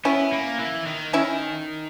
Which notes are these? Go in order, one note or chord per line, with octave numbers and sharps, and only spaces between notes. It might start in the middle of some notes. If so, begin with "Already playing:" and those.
B3 C#4 E4
A#3
E3
D#3
C#4 E4